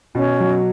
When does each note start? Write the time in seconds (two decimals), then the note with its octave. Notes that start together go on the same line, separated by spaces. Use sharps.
0.15 B2 C#4
0.40 F#3